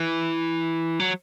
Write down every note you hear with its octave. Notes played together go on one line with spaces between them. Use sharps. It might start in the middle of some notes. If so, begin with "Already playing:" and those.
Already playing: E3
F#3